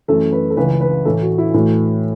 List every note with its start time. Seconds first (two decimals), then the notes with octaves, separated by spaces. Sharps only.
0.08 F#2 E3 A3 A4
0.32 B4
0.50 A4
0.57 C#2 C#3 E3 B4
0.81 B4
1.05 A2 E3 A3 A4
1.21 F#4
1.38 E4
1.54 A2 E3 A3 F#4